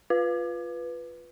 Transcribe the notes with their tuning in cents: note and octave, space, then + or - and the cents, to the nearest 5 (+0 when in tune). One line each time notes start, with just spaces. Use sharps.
F4 +0 B4 +0